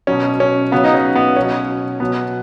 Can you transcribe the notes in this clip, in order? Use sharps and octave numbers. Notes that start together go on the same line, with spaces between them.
B2 F#3 C#4
C#4
C#3 F#3 B3
D#4
C#4
B3
B2 F#3 C#4
B2 F#3 B3